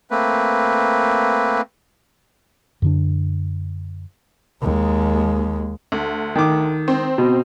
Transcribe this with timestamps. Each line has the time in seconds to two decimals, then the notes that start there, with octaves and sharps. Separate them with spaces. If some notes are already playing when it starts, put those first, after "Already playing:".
0.11 A3 A#3 C4 B4
2.82 F#2 D3 D4
4.62 D#2 G#3
5.92 D2
6.35 D#3 D6
6.88 C4
7.18 B2